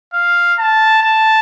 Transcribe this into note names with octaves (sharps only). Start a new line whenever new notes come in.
F5
A5
A5